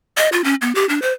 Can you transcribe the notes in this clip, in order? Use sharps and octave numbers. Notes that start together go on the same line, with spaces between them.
D#5
F4
C#4
B3
G4
D4
C5